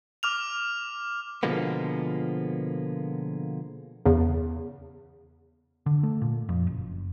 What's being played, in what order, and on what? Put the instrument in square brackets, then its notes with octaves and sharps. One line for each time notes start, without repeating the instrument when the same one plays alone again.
[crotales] D6 F6 F7
[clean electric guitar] B2 D3 F3 G#3 A#3 B3
[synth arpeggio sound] E2 C#3
[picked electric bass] D3
A3
A#2
F2
F#1